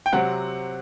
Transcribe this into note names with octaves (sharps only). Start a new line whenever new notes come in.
G5
C3 F#3 C4 F#5